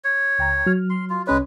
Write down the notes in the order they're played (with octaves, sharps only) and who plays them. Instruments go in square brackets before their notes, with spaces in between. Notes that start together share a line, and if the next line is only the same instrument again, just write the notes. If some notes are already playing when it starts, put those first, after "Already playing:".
[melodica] C#5
[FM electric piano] C#2 G5 A#5
F#3 F6
[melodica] C6
F4
[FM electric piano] C2 C#4 C#5 [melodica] G#3 B4